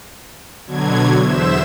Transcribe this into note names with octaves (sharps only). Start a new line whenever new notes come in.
B2 D3 F#3 G#6
E2 C5 E5 E7